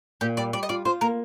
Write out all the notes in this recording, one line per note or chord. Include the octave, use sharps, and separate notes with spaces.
A#2 G4
G3 D5
G3 D5
D#5
F4 D5
F4 C5
A#3 A#4